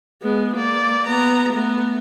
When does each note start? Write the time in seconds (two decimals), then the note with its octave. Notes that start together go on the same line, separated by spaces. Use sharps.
0.22 G#3 B3
0.55 A#3 D5
1.07 B3 A#5
1.53 A3 B3